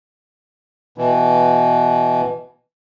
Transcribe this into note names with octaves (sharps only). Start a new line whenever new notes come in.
B2 E3